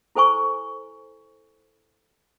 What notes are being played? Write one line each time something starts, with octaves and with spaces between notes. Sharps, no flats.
E4 A4 C5 G#5 C#6